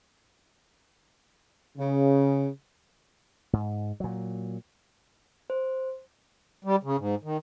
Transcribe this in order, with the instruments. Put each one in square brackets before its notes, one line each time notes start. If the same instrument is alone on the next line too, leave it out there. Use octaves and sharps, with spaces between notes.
[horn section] C#3
[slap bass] G#2
A#2 F#3
[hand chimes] C5
[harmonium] G3
C#3
G#2
D#3